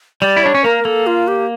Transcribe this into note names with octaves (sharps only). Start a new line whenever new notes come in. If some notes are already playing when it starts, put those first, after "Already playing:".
G3 D5
E4
D4 C#5
C#4
A#3 A#4
A#3 A4
F4
G4